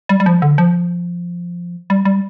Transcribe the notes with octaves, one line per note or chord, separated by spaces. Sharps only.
G3
G3
F3
D3
F3
G3
G3